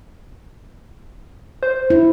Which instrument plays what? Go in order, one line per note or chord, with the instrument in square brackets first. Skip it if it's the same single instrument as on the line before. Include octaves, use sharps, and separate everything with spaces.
[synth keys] C5
[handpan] E4